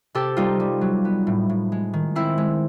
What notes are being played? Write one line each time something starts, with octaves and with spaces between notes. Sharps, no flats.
C3 G4 A4
G3 D#4 F4
G3
F#3
B3
A2
A2
G#3
D#3
C4 E4
G#3